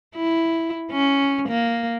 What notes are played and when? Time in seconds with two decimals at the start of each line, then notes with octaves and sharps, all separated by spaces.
0.16 E4
0.92 C#4
1.49 A#3